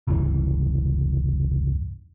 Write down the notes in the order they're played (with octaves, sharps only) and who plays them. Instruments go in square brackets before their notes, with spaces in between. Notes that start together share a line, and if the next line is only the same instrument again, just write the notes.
[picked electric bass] F1 C#2 G2 E3